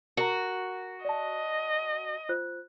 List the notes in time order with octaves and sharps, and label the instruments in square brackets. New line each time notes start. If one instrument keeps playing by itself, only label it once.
[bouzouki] F#4 [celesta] A#4 A#5
[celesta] D5 A5 [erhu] D#5
[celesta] F4 C5 F#6